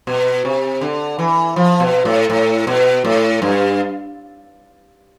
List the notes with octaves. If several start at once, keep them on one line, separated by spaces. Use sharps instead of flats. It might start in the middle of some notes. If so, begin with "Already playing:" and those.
B2
C3
D3
E3
F3
B2
A2
A2
B2
A2
G2